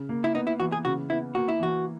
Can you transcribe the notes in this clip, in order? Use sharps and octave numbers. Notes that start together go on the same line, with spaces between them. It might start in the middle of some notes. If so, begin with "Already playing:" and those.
Already playing: C#3
A#3
E4
B3 D#4
E4
E3 F#4
G#4
C#3 F#4
B3 E4
A#3 F#4
E4
E3 F#4